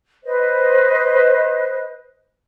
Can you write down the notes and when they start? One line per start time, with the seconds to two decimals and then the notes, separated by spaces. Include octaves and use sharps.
0.24 B4 C5 D#5